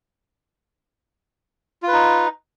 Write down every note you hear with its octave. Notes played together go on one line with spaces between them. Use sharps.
D#4 F4 B4